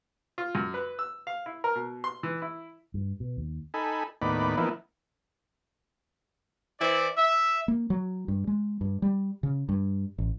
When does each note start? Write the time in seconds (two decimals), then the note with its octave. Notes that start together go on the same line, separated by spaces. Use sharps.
0.38 F4
0.55 F#2
0.74 B4
0.99 E6
1.27 F5
1.46 E4
1.64 A#4
1.75 B2
2.04 C6
2.23 E3
2.42 E4
2.94 G2
3.20 B2
3.37 D#2
3.74 D#4 A4 G#5 B5
4.22 D#2 A2 B3 D#4 D5 B5
4.57 E3 F3 A#3 B3 D#4 E4
6.80 E3 E4 C5 D5
7.17 E5
7.68 A#3
7.90 F#3
8.28 G2
8.47 G#3
8.81 G2
9.02 G3
9.43 C#3
9.69 G2
10.18 A1